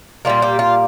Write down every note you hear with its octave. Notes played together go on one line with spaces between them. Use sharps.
A#2 G3 A#3 F4
G4
F4